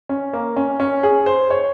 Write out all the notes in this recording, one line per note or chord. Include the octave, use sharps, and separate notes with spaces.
C#4
A#3
C#4
C#4
G#4
C5
C#5